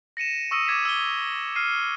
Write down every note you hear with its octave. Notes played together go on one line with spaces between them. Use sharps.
A#6 C#7 D#7 E7
C#6 D#6 E6 A#6 C#7 D#7
D6 G#6 B6 E7
E6 G7
F6 C7 D#7